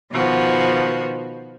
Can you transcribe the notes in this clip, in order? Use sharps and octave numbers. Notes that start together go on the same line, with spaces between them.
B2 D#3 F3 F#4 B4